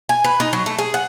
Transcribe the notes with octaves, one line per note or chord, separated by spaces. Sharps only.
G#5
B4
D#4
F#3
A3
G#4
F#5